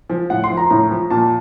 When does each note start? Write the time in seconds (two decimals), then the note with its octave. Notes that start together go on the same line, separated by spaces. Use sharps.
0.10 F3
0.30 A2 F#5
0.44 C6
0.50 F3
0.57 A#5
0.70 A2 A#5
0.90 F3
1.10 A#2 A5